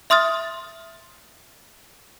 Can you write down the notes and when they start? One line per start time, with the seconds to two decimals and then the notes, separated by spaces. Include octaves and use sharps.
0.10 E5 C6 D#6 F6 A6